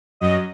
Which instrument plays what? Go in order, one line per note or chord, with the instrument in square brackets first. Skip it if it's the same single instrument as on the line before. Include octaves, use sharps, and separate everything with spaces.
[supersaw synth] F#2 F#3 D#5